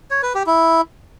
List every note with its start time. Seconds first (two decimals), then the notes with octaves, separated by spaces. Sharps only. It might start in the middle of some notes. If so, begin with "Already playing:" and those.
0.11 C#5
0.23 B4
0.35 G4
0.47 E4